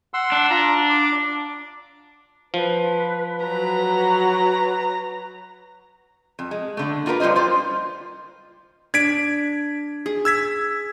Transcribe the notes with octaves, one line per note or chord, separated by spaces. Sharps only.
F#5 C6 E6
D4
F4 A#5
D6
F3 B4
F#3 A#5
F2
G#3
D3 A3
A#3 F4 F#4 A#4 B4
G3 F4 B4 C5 D#5
G3 F4 C5
D4 G#6 B6 D7
G#4
E6 G#6 B6